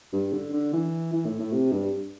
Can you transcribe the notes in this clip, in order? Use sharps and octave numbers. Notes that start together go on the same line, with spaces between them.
G2
D3
D3
E3
E3
A2
A2
C3
G2